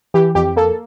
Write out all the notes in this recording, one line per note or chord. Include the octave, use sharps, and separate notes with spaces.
E3 G4
F2 G4
A#3 A4